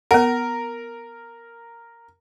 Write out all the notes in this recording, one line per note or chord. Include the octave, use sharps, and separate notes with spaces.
B3 A#4 F#5